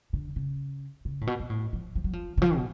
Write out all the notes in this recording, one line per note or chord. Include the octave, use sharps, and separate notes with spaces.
D3
C#3
C#3
A2
B2
B2
A2
F3
F3
F#3
F3
D3
F3
B2